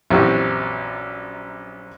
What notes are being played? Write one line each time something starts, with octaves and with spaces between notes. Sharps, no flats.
A#1 F#2 E3 C4 F#4 G4